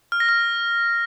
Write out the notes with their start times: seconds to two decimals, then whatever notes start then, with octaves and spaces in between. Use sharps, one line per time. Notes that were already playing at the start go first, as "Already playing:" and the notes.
0.12 F6
0.20 A#6
0.29 F6